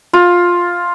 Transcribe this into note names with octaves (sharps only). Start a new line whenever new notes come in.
F4